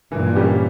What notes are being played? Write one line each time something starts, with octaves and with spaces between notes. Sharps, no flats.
G2 A#2 E3
G3 A#3 C#4 G4